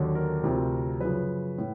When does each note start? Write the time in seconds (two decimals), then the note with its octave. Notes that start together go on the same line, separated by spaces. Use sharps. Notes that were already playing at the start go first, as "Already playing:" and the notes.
Already playing: D#2 D3 F#3
0.15 A#4
0.43 D2 C3 F3
1.01 F#2 C#3 F3 B4
1.58 A2